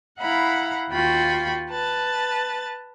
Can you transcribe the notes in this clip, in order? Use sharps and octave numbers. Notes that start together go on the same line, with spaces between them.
E4 F5 F#5 A#5 B5
D#2 F4 F#4 G5 B5 C#6
B4 A5 A6